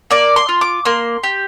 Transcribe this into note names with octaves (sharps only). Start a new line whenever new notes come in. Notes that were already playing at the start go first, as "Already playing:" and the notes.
A#3 D5
C6
F4
D6
A#3 C6
G4